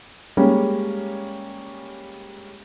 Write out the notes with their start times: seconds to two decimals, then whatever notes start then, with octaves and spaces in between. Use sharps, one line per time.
0.37 G3 G#3 A#3 C#4